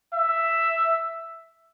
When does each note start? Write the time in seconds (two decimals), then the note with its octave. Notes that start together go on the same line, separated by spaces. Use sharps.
0.13 E5